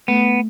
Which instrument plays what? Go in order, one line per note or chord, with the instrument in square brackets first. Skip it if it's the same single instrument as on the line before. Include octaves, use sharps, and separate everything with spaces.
[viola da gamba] A3 [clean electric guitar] B3